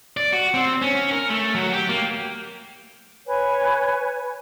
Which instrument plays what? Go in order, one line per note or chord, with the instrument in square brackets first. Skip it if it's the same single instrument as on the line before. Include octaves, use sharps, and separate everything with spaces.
[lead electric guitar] D5
F#4
C4
C#4
A#4
A3
F#3
G4
A#3
[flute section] B4 C#5 G#5